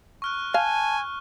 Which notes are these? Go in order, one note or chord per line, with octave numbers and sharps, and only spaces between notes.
C#6 F6 F#6
F5 G#5 A5